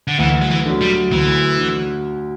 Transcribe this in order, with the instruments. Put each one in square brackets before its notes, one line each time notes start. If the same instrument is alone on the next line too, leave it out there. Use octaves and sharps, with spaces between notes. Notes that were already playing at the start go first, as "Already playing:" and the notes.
[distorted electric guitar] D3
[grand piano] D2 [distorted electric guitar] E3
[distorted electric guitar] F#3
E3
[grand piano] D3 F#3
[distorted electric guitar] G3
[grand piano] D2 [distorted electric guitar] E3
[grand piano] D3